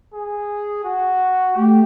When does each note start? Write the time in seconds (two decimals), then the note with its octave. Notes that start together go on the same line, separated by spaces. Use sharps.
0.14 G#4
0.84 F#4
1.55 A3 G4